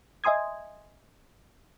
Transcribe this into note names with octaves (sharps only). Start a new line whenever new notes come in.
D#5 E5 G#5 C6 D#6 G#6